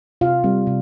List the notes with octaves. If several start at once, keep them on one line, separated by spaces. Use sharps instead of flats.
C3 F4 F5
G3 C4
C3